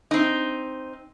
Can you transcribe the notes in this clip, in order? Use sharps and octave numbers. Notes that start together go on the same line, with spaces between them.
C4 D#4